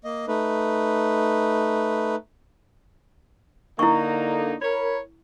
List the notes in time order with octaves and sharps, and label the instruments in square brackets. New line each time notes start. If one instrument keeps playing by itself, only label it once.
[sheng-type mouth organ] A#3 D#5
A3 D#4 B4
[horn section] D3 A#3 D#4 [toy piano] E4 C#6
[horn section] A#4 C#5 B5